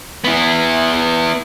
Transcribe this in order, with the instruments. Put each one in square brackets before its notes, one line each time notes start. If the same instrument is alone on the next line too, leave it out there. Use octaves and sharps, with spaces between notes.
[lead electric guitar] B3 E4